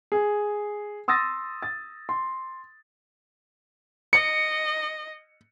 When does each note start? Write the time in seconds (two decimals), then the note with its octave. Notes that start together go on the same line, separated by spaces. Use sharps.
0.12 G#4
1.08 C6 D#6 E6 A6 A#6
1.62 A6
2.09 C6
4.13 D#5 C#7